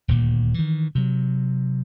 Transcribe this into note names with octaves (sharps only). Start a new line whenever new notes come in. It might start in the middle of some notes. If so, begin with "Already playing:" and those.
D#1 D2 A#2
D#3 E3
C3 F#3